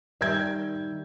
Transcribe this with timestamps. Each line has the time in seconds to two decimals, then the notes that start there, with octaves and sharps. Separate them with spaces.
0.21 D#3 G3 E5 G5 G6 G#6